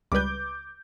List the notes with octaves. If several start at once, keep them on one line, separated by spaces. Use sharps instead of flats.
C#2 G3 B4 D6 G6